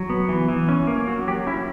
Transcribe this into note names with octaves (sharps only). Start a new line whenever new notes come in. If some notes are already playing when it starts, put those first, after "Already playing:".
Already playing: F#3
B3
E3
E3
C#4
A#3
F#3 F#4
F#3 G4
C#4 E4